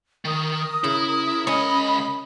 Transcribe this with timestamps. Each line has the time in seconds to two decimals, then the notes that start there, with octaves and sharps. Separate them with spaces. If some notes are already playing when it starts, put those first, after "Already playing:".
0.25 D#3 A#4 D#6
0.84 C#3 E4
1.47 C#2 C#4 D#5 B5